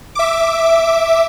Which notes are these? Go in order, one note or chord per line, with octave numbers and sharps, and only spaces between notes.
E5 D6